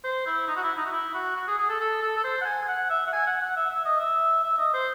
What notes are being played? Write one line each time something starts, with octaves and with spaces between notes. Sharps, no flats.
C5
E4
D#4
F#4
E4
D#4
F#4
E4
F#4
F#4
G#4
G#4
A4
A4
A4
A4
C5
F#5
G#5
G#5
F#5
E5
F#5
G#5
F#5
F#5
E5
E5
D#5
E5
E5
D#5
C5